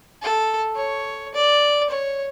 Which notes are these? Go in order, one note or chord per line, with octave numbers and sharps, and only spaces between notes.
A4
C#5
D5
C#5